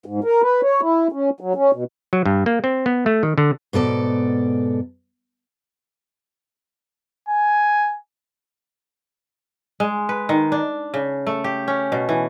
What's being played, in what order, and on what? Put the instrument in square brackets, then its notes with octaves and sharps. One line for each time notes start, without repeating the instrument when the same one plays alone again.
[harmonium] G#2
A#4
B4
C#5
E4
C#4
F#3
C#4
B2
[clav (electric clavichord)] F#3
G2
A#3
C4
B3
A3
D#3
D3
[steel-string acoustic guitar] G#2 B2 A4 D5
[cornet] G#5
[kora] G#3
B4
D#3
D4
C#3
A3
G4
C#4
B2
E3